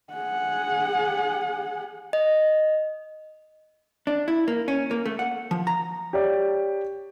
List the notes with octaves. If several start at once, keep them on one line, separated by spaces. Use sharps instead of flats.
G#4 F#5
D#5
D4
E4
A#3
C#4
A#3
A3
F#5
F3
A#5
G4 C#5 D5